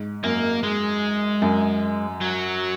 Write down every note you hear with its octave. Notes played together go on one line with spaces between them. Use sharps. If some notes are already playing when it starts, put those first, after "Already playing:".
Already playing: G#2
F#2 A#3
G#3
F#2
F#3